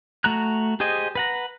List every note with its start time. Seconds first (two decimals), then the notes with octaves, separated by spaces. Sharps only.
0.24 A3 F#4 A#5 F#6
0.80 G4 G#4 C5 D#5 G#5
1.15 B4 F#5 A#5